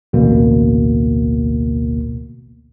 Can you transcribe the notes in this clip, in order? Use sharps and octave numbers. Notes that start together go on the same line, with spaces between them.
A1 D2 B2 A#3